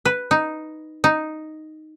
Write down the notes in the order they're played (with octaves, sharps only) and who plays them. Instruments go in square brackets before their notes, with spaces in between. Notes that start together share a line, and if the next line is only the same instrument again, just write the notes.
[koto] B4
D#4
D#4